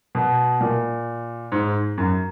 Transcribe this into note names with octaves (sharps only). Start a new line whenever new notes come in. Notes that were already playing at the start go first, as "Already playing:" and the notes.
B2
A#2
G#2
F#2